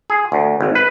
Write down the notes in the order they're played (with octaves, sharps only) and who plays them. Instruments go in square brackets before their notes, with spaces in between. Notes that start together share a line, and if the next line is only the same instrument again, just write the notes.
[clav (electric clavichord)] G#4
D2
G#1
B4